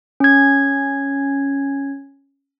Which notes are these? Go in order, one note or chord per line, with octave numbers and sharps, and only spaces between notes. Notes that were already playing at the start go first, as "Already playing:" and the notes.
C#4 G#6